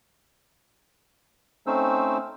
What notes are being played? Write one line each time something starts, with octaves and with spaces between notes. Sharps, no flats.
A3 C4 C#4 D#4 C5 E6